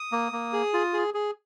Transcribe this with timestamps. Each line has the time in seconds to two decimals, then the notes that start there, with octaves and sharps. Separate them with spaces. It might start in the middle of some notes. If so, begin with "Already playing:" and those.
Already playing: D#6
0.12 A#3
0.32 A#3
0.53 G#4
0.73 F4
0.93 G#4
1.14 G#4